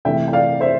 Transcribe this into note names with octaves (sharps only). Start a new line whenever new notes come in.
C3 E3 A3 E5 G5
G5
D5 F5
C5 E5